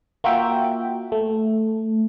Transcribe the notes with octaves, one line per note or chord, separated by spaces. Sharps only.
A#3 F4 F#4 A#4 E5 G5
A3